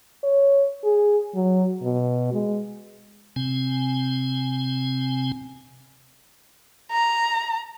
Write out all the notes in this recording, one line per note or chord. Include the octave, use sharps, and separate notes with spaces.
C#5
G#4
F#3
B2
G#3
C3 C4 G#5
A#5